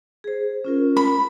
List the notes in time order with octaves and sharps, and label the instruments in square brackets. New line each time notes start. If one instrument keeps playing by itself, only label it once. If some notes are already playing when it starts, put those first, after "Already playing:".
[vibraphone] G#4 C5
C#4 F4 A#4
[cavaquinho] B5